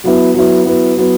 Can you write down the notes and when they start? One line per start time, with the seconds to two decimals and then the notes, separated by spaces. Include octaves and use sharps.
0.04 F#3 B3 E4
0.34 F#3 B3 E4
0.65 F#3 B3 E4
0.97 F#3 B3 E4